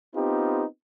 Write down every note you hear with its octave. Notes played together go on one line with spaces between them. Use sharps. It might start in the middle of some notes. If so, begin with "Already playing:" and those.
B3 C4 D#4 F4 G4